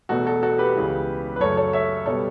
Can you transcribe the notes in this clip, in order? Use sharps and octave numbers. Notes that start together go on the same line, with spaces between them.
E1 E2 B2 A3 F#4 A4
F#4 A4
F#4 A4
G4 B4
C#2 C#3 E3
B4
F#2 C#3 F#3 A3 A4 C#5
A4 C#5
C#5 E5
B2 G3 A4 C#5